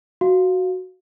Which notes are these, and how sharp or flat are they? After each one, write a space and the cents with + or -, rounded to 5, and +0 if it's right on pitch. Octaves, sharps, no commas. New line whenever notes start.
F#4 +0 F5 +0